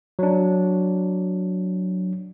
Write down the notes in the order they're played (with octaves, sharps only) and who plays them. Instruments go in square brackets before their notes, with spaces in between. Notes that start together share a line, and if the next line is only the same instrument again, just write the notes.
[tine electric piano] F#3 D4